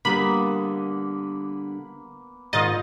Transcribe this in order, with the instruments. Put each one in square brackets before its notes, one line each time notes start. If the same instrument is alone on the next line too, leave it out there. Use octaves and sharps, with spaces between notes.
[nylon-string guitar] D3 G3 [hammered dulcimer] A#3 B3 [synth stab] B5
[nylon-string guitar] G#2 D#3 [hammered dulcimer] D#4 F4 [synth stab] D#5 A6